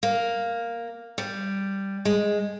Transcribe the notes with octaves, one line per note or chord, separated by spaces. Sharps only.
A#3
G3
G#3